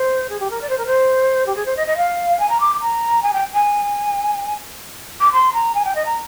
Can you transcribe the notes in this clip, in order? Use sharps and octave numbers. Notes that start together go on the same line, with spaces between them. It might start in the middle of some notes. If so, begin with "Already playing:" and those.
Already playing: C5
G#4
G4
A#4
D5
C5
A#4
C5
G4
G#4
C5
D#5
D#5
F5
G#5
A#5
D6
A#5
G#5
G5
G#5
D6
C6
A#5
G#5
G5
D#5
A#5